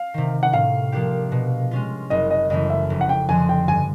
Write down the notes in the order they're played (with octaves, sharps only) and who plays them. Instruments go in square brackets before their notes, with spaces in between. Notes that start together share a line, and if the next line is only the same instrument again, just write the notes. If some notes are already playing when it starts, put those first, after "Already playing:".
Already playing: [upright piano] F5
[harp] C3 D#3
[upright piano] F#5
[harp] A2 [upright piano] F5
[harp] F3 A#3 D4 G4
B2
G#3 C#4 F4
[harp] F#1 [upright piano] D#5
[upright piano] D#5
[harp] F#2 C#3 E3 A3 [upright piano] D#5
[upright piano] E5
[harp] F1
[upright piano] F#5
G5
[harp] F2 D3 F3 [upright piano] G#5
[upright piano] G5
[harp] G2 [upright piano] G#5